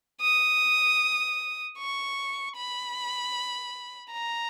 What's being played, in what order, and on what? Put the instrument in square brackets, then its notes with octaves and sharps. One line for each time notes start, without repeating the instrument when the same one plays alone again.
[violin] D#6
C#6
B5
A#5